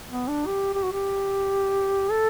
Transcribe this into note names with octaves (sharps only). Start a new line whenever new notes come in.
B3
D4
G4
G4
F#4
G4
A4